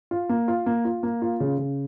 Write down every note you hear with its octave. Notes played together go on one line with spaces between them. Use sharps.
F4
A#3
F4
A#3
F4
A#3
F4
C#3
C#3